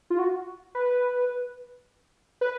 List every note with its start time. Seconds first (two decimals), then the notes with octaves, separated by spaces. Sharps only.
0.10 F4
0.19 F#4
0.75 B4
2.41 B4